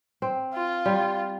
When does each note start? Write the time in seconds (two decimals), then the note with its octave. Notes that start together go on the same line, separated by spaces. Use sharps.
0.22 C4
0.54 F4
0.86 G3